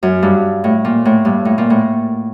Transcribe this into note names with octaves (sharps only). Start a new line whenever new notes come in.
F#2
G2
A2
A#2
A2
G2
A2
A#2
A2